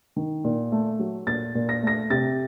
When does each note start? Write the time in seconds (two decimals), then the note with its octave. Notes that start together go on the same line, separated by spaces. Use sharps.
0.16 D#3
0.44 A#2
0.72 A3
0.99 F#3
1.27 A#2 A6
1.55 A#2
1.69 A#6
1.83 A3 A#6
2.10 C3 A6